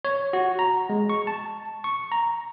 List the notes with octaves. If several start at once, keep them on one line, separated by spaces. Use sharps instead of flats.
C#5
F#4
A#5
G#3
C#6
A5
C#6
A#5